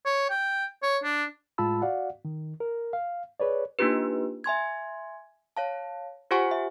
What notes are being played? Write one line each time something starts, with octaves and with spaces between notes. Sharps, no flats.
C#5
G5
C#5
D4
A2 G#3 F4 A5 B5 E6
F#4 D5 F5 F#5
D#3
A#4
F5
G#4 B4 C#5 D5
A#3 D4 D#4 F4 G4 B4
E5 G#5 C6 G#6
C#5 F5 A5
F4 G4 C5 F#5 G#5 C#6
E5